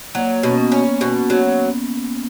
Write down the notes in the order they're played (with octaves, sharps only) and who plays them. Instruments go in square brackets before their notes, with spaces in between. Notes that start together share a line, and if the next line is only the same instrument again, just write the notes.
[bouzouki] F#3 [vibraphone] A#3
[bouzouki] B2 [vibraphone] C#4
[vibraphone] B3
[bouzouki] C#4
[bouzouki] B2 [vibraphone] B3
[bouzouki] F#3